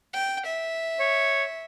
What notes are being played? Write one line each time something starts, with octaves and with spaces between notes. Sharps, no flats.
G5
E5
C#5